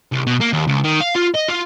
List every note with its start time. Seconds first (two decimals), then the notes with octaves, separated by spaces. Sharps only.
0.12 C2
0.27 B2
0.41 A#3
0.53 D#2
0.68 C#2
0.84 D#3
1.01 F5
1.16 F4
1.35 D#5
1.49 F4